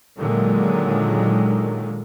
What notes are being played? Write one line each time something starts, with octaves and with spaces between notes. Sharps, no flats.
A#2 D3 D#3 F#3 G#3